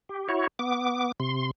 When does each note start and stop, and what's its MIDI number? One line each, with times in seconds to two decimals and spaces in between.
0.09 0.28 67
0.29 0.47 64
0.29 0.47 66
0.29 0.47 73
0.59 1.12 59
0.59 1.12 86
1.20 1.51 48
1.20 1.51 84